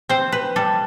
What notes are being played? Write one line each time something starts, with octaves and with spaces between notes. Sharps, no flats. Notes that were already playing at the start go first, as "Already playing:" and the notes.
C4 C5
B4
G3 A4